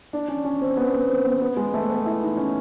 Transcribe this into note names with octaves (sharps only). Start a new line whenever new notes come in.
D4
C#4
C#4
C4
B3
B3
C4
B3
B3
G#3
A3
B3
E4
D#4
C#4